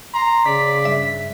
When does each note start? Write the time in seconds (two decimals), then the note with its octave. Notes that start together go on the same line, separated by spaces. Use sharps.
0.14 A#5 C6
0.46 C#3 D5 B6
0.85 G2 E5